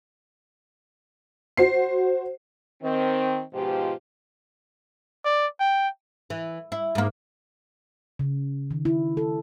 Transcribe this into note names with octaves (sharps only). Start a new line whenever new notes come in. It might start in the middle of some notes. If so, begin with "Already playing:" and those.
F#4 C5 C7
D#3 C4
G#2 B2 F3 F4 G4
D5
G5
E3
E4
G#2 A#3
C#3
D#3
E4
A4